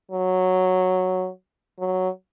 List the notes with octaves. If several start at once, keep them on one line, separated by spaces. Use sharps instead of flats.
F#3
F#3